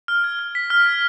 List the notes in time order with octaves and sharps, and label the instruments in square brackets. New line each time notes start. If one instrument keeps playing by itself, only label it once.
[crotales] F6
G#6
F6
B6
F6
G#6